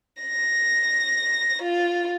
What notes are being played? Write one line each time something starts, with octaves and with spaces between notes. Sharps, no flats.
A#6
F4